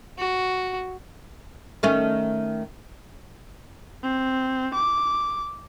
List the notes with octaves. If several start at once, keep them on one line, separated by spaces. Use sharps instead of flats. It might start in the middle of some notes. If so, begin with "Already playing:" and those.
F#4
D#3 A3 C#4
C4
D6